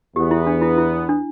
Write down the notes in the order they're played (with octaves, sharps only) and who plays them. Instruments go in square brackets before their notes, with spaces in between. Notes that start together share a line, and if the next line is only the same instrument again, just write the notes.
[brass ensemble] E2 E3 B3 [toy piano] G4
[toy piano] E4
D4
E4
E4
D4